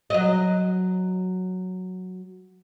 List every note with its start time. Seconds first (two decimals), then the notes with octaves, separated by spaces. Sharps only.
0.10 F#3 D#5